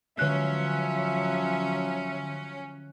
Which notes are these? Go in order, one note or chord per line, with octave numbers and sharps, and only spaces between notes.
D3 F3 F#3 C#4 E5 F#6